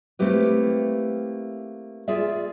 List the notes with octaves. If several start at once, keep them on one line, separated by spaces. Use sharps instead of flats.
A3 A#3 C4 E4 G4 B4
F4 G#4 D5 E5